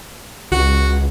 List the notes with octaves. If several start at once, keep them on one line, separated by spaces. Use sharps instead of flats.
C#2 F#4